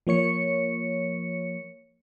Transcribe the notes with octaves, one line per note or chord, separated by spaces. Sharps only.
F3 A#3 C#5 C#7